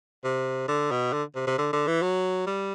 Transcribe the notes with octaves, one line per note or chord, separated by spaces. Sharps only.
C3
D3
B2
D3
C3
C3
D3
D3
E3
F#3
G3